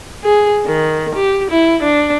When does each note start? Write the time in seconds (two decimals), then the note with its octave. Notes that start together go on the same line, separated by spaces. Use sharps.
0.24 G#4
0.66 D#3
1.15 G4
1.50 E4
1.83 D4